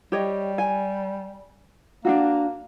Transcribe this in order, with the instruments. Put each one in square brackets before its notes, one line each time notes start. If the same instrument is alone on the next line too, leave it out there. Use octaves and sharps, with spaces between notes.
[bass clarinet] G3 [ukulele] G4 C#5 D#5
[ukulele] G#5
[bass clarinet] A#3 [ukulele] D4 D#4 F#4